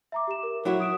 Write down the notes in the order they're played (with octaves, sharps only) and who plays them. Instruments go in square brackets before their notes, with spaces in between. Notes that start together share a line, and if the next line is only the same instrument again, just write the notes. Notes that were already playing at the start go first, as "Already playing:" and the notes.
[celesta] E5 A#5 D6
G4 E7
A#4
[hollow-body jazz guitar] F#3 E4 F#4
[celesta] D#6 D7 E7